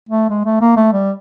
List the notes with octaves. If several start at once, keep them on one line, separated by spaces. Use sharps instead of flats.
A3
G#3
A3
A#3
A3
G3